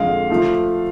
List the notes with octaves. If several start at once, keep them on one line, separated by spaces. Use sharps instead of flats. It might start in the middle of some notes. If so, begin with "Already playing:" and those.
Already playing: F2 D3 G#3 F5
F3 A3